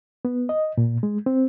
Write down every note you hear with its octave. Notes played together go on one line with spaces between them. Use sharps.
B3
D#5
A#2
G#3
C4